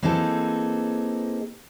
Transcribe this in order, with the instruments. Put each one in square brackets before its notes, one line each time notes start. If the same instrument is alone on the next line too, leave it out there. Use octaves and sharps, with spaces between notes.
[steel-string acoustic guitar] E3 A#3 C4 D#4 G#4 A4